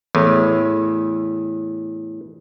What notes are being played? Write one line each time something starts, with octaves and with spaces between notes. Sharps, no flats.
E2 A2